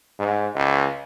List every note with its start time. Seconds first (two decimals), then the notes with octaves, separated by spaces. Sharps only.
0.19 G#2
0.56 C#2